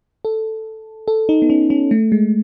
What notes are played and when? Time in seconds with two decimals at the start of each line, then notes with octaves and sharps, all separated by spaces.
0.25 A4
1.08 A4
1.29 D#4
1.42 B3
1.50 C#4
1.70 C#4
1.91 A3
2.12 G#3